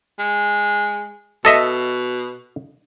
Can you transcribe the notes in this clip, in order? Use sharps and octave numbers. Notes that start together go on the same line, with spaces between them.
G#3
B2 A4 D#5 E5